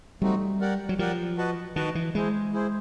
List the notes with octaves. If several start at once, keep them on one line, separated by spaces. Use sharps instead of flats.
G3 A3 C4 D#4 F#4
G4 A#4 D5 F#5
F#3
F3 G4 A#4 D5 F#5
F#4 B4 D#5 F#5 A5
D#3 F#4 B4 D#5 F#5 A5
E3
G#3 E4 G#4 C5
E4 G#4 C5